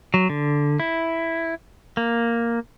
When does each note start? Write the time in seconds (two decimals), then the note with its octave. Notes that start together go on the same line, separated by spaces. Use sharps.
0.14 F#3
0.30 D3
0.80 E4
1.97 A#3